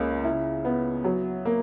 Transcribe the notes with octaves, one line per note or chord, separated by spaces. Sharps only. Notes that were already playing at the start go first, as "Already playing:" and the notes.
Already playing: C#2 C#3 A#3
E4
B3
F#3
A#3